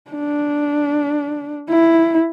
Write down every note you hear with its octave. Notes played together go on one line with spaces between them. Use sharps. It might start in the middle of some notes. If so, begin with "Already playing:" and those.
D4
E4